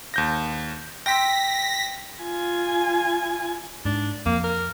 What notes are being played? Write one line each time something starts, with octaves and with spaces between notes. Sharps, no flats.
D#2 G6 A#6
G5 C6 E6 A#6 B6
F4 G#5
G#2 D4
F2 A#3
A#4